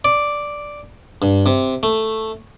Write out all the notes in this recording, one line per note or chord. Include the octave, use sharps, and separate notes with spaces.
D5
G2
C3
A3